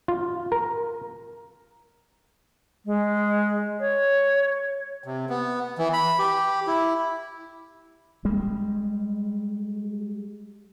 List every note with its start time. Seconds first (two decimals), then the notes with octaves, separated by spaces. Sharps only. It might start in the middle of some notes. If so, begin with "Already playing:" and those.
0.08 F4
0.52 A#4
2.86 G#3
3.80 C#5
5.04 C3
5.29 B3
5.78 E3
5.93 B5
6.19 G4
6.67 E4
8.25 G3 G#3